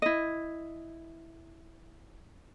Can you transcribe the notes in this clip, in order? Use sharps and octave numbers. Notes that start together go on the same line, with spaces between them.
E4 D#5